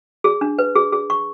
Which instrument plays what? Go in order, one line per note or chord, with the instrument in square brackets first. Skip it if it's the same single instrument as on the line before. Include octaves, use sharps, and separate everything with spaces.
[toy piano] G#4
D4
B4
G#4
G#4
C#6